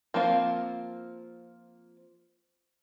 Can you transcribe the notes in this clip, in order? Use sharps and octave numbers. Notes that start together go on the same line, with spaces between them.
F3 A#3 C4 F4